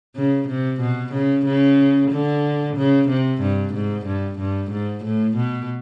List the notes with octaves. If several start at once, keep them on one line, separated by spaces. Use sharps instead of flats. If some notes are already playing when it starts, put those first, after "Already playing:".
C#3
C3
B2
C#3
C#3
D3
C#3
C3
G2
G#2
G2
G2
G#2
A2
B2